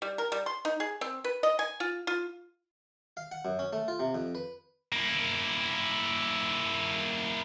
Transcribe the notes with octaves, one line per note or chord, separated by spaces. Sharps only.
G3
A#4
G3
C6
D#4
G#4
C4
B4
D#5
G#5
F4
F4
F5
F#5
F#2
C#4
A3
F4
C3
F2
B4
A#3 E4